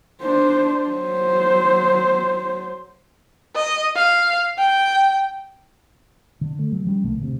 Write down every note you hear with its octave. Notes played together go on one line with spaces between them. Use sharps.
D4 C5
F#3 C5
D#5
F5
G5
D3
A3
F#3
F3 G3 C#4
B1 D3 A3 A#3
D1 D2 C3